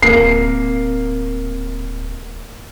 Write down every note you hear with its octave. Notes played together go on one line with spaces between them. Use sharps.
D1 A#3 C4 C7